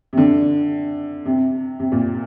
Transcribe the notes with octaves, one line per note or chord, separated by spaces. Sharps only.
C3
D3
C3
C3
A#2